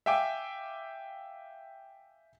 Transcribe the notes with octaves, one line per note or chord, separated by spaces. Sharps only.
E5 F5 G5 G#5 D6